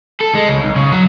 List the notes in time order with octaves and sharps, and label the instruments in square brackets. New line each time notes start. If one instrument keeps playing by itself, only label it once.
[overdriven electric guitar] A4
G#3
C#2
B1
C#3
F#3